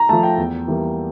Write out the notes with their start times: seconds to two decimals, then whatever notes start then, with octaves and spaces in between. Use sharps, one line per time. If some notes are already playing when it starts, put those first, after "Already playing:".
Already playing: A#5
0.09 F3 A3 A5
0.23 G5
0.38 E2
0.68 E3 G3 A#3